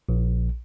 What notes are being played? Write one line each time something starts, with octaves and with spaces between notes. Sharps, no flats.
A#1